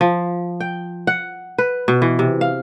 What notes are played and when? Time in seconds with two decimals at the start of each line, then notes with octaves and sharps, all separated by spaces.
0.01 F3
0.60 G5
1.07 F#5
1.58 B4
1.88 B2
2.02 E3
2.19 C3
2.41 F5